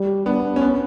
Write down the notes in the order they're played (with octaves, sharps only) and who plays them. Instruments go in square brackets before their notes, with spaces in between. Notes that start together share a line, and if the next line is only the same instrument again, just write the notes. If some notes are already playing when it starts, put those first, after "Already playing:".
Already playing: [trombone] G3
[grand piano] B3 [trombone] D4
[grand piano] C#4
B3